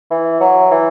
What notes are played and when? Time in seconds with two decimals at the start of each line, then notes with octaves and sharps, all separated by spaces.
0.11 E3
0.41 F#3
0.71 E3